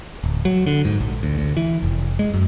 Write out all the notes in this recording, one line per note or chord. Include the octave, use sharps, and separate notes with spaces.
D1
F#3
D3
G#2
A#1
D2
D2
E3
F1
G#3
F#2